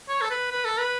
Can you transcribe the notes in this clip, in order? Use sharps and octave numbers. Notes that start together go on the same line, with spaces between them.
C#5
A4
B4
B4
A4
B4